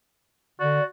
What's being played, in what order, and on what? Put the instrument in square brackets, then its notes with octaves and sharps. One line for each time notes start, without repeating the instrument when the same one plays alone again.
[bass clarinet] D3 [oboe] F#4 [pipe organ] D5